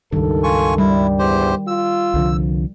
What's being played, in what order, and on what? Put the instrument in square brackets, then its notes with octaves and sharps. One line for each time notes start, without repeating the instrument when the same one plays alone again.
[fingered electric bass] C#2 G2 [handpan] D#3 [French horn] A4
[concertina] F4 G#5 C#6
[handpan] G3 [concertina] E4
[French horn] E2 [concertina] G4 C5
[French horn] F4 [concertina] E6
[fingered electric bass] C2 D3 F3